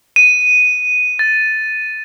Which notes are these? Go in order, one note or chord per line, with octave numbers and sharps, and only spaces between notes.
D#7
A6